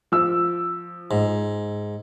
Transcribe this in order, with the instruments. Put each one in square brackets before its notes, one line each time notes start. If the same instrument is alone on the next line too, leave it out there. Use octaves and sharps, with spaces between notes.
[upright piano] F3 E6
[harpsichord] G#2